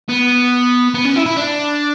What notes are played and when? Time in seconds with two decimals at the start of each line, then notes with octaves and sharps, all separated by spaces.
0.09 B3
0.94 B3
1.05 C#4
1.16 E4
1.26 E4
1.37 D4